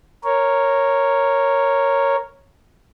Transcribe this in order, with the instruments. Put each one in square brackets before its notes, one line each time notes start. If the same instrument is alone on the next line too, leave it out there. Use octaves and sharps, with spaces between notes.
[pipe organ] A#4 C#5